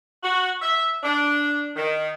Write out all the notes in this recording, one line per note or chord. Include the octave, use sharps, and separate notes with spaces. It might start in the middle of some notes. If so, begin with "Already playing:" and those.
F#4
E5
D4
D#3